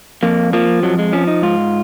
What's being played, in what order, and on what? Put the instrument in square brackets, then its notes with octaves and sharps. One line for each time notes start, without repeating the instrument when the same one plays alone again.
[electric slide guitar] F2 A#3
F3 A#3
F2 F#3
G#3
F3 C#4
D#4
G#2 F4